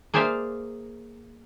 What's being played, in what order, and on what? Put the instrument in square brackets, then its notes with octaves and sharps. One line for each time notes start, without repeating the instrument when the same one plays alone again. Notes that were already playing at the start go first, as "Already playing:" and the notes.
[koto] A#3 G#4 C5 D5 E5 F5